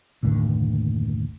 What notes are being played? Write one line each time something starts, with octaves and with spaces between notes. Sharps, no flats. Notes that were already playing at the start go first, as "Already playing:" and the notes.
F#1 D#2 A2 D3